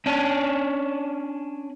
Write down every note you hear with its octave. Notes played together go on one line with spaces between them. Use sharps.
C#4 D4